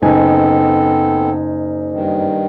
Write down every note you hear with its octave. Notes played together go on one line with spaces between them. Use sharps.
F#1 B3 C4 D#4 A4 G#5
G2 D#3